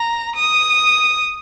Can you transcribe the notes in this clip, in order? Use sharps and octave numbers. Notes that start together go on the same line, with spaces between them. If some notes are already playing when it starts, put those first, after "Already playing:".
Already playing: A#5
D#6